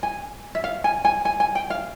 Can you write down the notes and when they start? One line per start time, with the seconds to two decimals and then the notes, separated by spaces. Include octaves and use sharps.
0.03 G#5
0.55 E5
0.64 F5
0.84 G#5
1.05 G#5
1.25 G#5
1.40 G#5
1.55 G5
1.70 F5